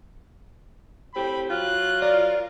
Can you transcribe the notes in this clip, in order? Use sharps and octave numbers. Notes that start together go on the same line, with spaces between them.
A2 C4 G4 B5
F#3 F4 F#6
A#4 D5